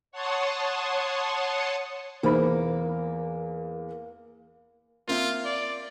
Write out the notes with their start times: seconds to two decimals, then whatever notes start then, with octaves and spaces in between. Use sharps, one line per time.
0.12 C#5 F#5 A5 C6 C#6 D#6
2.23 E2 A#3 D#4 C5 B5
5.08 A#3 C4 F4 E5
5.45 D5